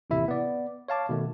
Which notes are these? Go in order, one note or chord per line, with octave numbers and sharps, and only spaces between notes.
A1 D#2 C3 E4 E5
B3 D5
C#5 F5 A5 D6
B2 D#3 A3